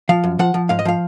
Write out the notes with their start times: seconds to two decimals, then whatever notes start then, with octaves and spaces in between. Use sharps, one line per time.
0.09 F3 F5
0.24 F#2
0.39 F3 F#5
0.54 F3
0.69 G#2 F5
0.79 D#5
0.85 F3 F5